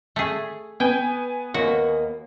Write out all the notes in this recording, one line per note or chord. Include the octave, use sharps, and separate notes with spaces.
A3 G#4
B3 G5 G#5
D#2 A#3 F#4